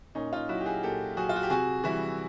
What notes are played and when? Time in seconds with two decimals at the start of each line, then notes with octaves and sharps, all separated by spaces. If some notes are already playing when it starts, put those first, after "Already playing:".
0.15 A#2 C#4 D#4
0.33 D#4 F4
0.49 F#3 E4 F#4
0.61 G4
0.66 F#4 G#4
0.83 A#2 G4 A4
1.17 F#3 F#4 G#4
1.29 F4
1.36 F#4
1.43 G4
1.50 C3 F#4 G#4
1.84 E3 G3 E4 F#4